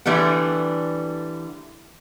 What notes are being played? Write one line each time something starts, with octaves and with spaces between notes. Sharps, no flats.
D3 E3 G3 A3 B3